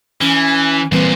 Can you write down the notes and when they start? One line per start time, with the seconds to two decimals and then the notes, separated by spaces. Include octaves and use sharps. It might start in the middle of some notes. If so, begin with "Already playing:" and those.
0.21 E3 C#4
0.92 A#2 E3 G3 C4 B4 C5